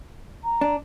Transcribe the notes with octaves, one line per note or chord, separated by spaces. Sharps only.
A#5
D4